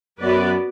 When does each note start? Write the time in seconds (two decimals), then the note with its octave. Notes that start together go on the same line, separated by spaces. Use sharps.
0.21 F#2 B3 F#4 B4 D5